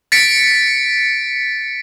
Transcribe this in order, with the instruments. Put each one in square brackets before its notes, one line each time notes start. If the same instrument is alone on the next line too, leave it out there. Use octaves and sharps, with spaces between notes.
[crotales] A6 B6 C#7 D7